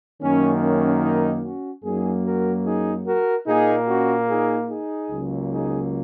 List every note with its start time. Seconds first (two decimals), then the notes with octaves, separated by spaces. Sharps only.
0.21 F#2 D#3 A#3 C#4
0.62 C#4
1.03 D#4
1.43 C#4 F#4
1.84 F#2 F#3 A#3 D#4 G#4
2.24 F#4 A#4
2.65 D#4 G#4
3.07 F#4 A#4
3.47 A#2 A#3 D#4 G#4
3.88 C#4 F#4
4.29 D#4 G#4
4.69 D#4 G#4
5.10 C#2 C#3 F#3 A#3
5.51 D#4 G#4